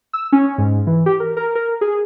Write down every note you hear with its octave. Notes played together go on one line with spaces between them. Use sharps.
E6
C#4
G#2
E3
G4
A#4
A#4
A#4
G#4